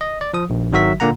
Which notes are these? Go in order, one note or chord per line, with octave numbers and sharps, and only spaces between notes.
D#5
D5
F3 D#6
A#1
G#1 D#3 F#3 F#4 E5 B6
A#2 D3 A#3 F#5 A#5